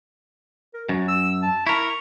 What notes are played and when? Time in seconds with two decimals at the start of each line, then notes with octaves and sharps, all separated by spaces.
0.74 A#4
0.89 F#2 F#4
1.08 E6
1.42 A5
1.67 E4 A#4 C#6